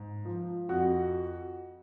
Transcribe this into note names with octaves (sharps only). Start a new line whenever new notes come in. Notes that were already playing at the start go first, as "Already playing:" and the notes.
Already playing: G#2
F3
F2 F#4